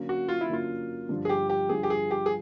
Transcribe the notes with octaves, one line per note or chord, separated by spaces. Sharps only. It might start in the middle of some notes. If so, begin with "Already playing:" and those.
Already playing: D3 F#3 A#3 C#4
F#4
F4
E4
D3 F#3 A#3 C#4 F4
G2 D3 F3
G#4
G4
G4
G2 D3 F3 G#4
G4
G#4
G4
G#4